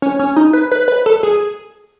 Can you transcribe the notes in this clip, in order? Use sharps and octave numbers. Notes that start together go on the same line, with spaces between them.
C#4
C#4
D#4
B4
B4
B4
A4
G#4